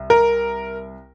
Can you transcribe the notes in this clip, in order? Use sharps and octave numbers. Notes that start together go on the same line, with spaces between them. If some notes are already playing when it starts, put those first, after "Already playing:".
Already playing: C2
A#4